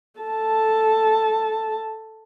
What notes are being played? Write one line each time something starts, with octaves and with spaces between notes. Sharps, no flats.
A4 A5